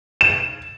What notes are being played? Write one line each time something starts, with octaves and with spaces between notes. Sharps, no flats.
E7